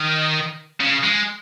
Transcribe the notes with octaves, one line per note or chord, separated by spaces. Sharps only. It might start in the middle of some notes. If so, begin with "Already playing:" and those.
Already playing: D#3
C#3
G#3